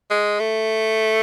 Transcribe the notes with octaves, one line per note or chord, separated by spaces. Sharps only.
G#3
A3